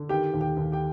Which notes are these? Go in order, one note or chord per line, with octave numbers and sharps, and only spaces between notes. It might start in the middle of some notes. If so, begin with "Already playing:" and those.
Already playing: D3
D#3 G4 G5
D#2
G4 G5
D#2
G4 G5